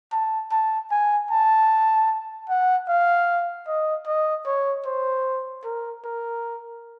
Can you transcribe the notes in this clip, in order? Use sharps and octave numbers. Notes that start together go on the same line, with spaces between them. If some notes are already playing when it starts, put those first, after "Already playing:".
A5
A5
G#5
A5
F#5
F5
D#5
D#5
C#5
C5
A#4
A#4